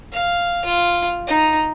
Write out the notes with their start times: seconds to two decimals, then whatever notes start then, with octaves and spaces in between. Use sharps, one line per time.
0.12 F5
0.65 F4
1.27 D#4